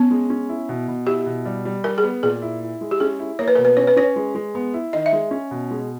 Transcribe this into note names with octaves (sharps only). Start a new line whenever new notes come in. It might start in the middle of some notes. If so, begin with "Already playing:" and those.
Already playing: B3 C#4
G#3
C#4
E4
B2
B2
E4 G4
B2
G3
G3
G3 A#4
G#4
B3
A#2 G#4
E4
E4
G#3
G4
C#4 G#4
E4
A#3 C#5
B4
B2 A#4
B4
C#4 C#5
B4
C#4 C#5
G#3
G#3
B3
E4
D#3 D#5
E5
G#3
C#4
B2
G#3